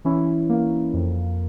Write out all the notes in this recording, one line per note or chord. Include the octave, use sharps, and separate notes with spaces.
E3 C#4 E4
A#3
F2